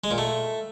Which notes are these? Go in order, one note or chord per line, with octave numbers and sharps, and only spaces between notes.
G#3
A#2
A3